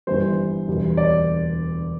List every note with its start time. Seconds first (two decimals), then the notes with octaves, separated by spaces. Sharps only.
0.07 G1 G2 E3 G3 C5
0.68 E1 D2 D3 G3
0.97 D5